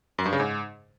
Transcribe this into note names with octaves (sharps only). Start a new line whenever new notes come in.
F#2
G2
C#3
G#2